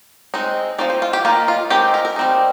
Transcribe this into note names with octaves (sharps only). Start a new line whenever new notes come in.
G#3 C4 D#4
F3 C4 D#4 D5
C5
F4
G4
D#3 A#3 D#4 F4
F4
G#3 C4 D#4 G4
A#4
A#4
G3 C4 D#4